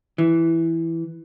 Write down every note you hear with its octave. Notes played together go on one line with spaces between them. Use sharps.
E3